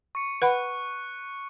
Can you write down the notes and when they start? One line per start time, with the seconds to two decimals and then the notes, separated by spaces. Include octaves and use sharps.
0.15 C#6 C#7
0.42 B4 F#5 B5 F#6